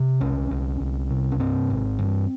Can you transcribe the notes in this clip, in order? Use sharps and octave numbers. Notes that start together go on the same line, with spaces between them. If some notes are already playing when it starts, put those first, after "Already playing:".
Already playing: C3
C2 C#4
C2
C2
C3
C#4
G2 C4
G#1
G2